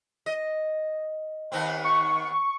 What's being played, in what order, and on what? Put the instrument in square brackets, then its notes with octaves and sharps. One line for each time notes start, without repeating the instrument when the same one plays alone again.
[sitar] D#5
D#2 B3 C4
[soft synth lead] C#6